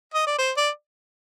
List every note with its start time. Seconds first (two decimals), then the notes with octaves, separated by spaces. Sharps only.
0.14 D#5
0.27 D5
0.38 C5
0.57 D5